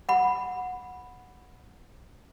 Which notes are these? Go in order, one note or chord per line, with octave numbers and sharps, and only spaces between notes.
F#5 B5